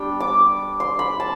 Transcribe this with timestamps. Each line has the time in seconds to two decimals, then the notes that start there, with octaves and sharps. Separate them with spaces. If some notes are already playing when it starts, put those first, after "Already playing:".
Already playing: G3 B3 D4 G5
0.20 D6
0.80 C6
0.99 B5
1.20 A5